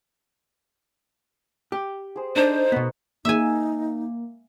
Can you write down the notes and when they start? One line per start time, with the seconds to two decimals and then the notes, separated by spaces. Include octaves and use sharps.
1.72 G4
2.16 G#4 C5
2.36 D4 D#4 A4 C5
2.72 B2 B3 D#5
3.25 A#3 D#4 E5 G#5